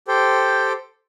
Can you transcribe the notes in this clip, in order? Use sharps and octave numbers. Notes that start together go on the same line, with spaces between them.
G4 A4 C5 G5